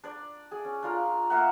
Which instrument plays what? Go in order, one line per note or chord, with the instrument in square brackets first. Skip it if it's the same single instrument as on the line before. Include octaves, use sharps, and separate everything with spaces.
[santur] D4 D5
G#4
C#4
D4 F4 A#4
A#3 A#4 E5 F#5